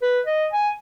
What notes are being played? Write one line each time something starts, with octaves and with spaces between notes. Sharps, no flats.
B4
D#5
G#5